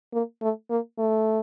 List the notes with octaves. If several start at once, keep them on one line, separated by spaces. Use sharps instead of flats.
A#3
A3
A#3
A3